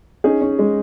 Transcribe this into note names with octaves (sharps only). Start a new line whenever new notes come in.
C#4 D#4 G#4
C#4
G#3